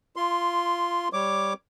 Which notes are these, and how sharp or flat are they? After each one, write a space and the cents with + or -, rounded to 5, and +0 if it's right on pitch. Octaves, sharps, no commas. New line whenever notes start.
F4 -15 C6 +0
G3 +0 C#5 -5 D6 +0